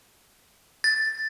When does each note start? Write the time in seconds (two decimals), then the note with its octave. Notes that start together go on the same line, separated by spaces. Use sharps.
0.84 A6